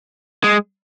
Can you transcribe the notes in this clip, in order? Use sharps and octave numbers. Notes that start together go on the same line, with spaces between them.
G#3